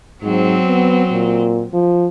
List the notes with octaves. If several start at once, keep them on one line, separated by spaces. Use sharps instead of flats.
G#2 F#3 C4
B3
A#2
F3